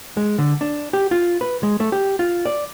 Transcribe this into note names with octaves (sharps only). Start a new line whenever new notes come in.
G#3
D3
D4
G4
F4
B4
G#3
A3
G4
F4
D5